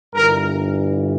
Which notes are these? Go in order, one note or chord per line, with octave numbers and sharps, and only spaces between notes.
G1 G2 E3 A#4